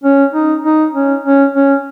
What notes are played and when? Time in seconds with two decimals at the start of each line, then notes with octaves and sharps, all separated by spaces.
0.04 C#4
0.33 D#4
0.64 D#4
0.94 C#4
1.24 C#4
1.55 C#4